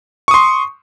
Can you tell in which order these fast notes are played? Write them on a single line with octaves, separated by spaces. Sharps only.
C#6 D#6 C6